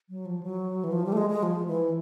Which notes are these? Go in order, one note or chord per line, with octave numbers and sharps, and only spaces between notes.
F#3
F3
F#3
E3
F3
G3
A3
G#3
G#3
F3
E3